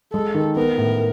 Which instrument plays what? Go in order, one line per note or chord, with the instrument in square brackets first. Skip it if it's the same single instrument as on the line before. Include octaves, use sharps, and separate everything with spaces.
[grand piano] G#3 [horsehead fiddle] A4
[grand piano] D#3
[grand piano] B3 [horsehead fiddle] A#4
[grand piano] A2